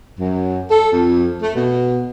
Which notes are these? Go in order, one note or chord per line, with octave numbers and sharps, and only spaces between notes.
F#2
A4
F2
A3
B2